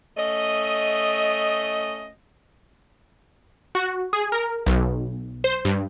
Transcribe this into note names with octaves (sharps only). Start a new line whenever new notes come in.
A3 C#4 D#5
F#4
G#4
A#4
B1
C5
G2